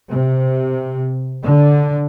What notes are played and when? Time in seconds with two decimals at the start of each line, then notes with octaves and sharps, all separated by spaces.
0.10 C3
1.44 D3